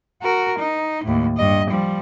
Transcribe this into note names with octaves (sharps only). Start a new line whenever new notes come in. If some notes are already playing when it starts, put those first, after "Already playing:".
F#4 A#4
D#4
D#2 A2
G2 D#5
F3 G3